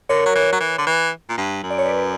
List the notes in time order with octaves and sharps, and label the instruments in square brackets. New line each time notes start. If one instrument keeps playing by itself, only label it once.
[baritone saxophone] D3 [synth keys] A#4 C#5
[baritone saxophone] F#3
E3
F#3
E3
D3
E3
A#2
G2
F#2
[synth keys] D5
C#5
B4 D5